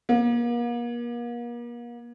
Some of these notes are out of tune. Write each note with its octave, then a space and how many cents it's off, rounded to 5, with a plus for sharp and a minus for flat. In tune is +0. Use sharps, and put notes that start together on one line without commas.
A#3 +40